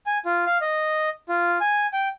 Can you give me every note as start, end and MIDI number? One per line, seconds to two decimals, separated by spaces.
0.06 0.18 80
0.26 0.45 65
0.47 0.58 77
0.61 1.09 75
1.29 1.58 65
1.61 1.87 80
1.93 2.08 79